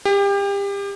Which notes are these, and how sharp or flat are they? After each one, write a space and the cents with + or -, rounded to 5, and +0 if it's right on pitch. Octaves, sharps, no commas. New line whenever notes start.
G4 +30